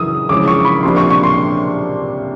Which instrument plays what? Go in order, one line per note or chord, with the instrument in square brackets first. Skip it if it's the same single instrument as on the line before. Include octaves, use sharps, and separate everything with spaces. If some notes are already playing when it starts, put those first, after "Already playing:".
Already playing: [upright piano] F#2 C#3 E3 [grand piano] D#6 E6
[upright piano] C#3 F3 G#3 C#4 E4 [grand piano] D6
[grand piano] C#6
B5
[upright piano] C3 F3 A#3 D4 [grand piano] C6
[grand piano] C#6
C#6
C6